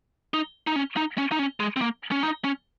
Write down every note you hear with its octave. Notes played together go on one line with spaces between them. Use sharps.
D#4
D#4
C#4
D#4
C#4
D#4
C#4
G#3
C4
A#3
C#4
D#4
C#4